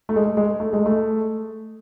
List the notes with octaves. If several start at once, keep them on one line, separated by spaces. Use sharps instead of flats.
A3
G#3
G#3
A3
G#3
A3